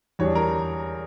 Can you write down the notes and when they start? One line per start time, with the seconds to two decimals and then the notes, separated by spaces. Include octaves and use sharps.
0.19 E2 E3 G3 D4 C#5
0.35 A#4